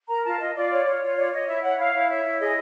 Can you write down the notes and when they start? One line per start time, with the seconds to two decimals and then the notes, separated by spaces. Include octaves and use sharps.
0.09 A#4 A#5
0.24 F4 A5
0.39 F4 D#5
0.55 F4 D5
0.70 C#5
0.85 F4 C#5
1.02 F4
1.17 C#5 D5
1.32 C#5 D#5
1.47 E4 E5
1.63 C#5 F#5
1.78 E4 F5
1.94 E4
2.09 C#5 E5
2.24 E4
2.39 G#4 D#5